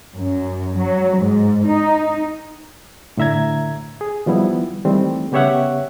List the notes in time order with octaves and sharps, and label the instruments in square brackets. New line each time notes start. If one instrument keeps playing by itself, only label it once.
[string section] F#2
F#3
G#2
D#4
[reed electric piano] A2 D3 E5 A#5 G#6
G#4
D#3 F3 G3 B3 E4
D#3 E3 G3 A3 C4
C#3 B3 G4 C#5 E5 F#5